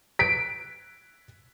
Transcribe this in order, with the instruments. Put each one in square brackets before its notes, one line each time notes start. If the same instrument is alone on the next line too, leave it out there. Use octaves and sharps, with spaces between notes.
[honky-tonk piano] B6 D7